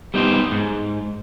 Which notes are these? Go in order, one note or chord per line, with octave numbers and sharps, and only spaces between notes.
G3 B3 D#4 G4 C5
G#2